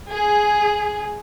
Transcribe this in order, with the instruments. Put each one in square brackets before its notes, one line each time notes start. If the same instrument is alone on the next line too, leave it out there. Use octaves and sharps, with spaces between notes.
[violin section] G#4